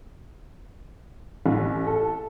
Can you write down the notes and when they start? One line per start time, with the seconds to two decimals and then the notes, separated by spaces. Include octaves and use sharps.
1.46 A1
1.87 A4